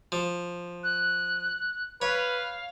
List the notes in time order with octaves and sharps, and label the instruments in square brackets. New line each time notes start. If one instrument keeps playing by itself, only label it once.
[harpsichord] F3
[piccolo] F#6
[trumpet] B4 [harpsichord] C#5 [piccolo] F5